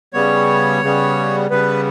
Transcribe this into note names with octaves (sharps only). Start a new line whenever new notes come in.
C#3 G3 B3 C#5
C#3 G3 B3
C#3 G3 B3 B4